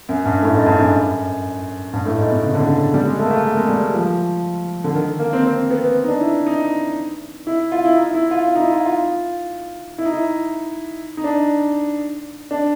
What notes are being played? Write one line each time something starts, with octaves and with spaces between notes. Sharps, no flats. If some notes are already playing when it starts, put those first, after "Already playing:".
F#2
G2
A2
G#2
G2
F#2
G2
A2
G#2
B2
C#3
D3
C#3
G3
G#3
A3
A#3
A3
A#3
G#3
G3
F3
D3
D#3
A#3
C4
C4
B3
D#4
D4
E4
D#4
E4
F4
E4
D#4
E4
F4
F4
D#4
E4
F4
F4
E4
D#4
E4
D#4
D4
D4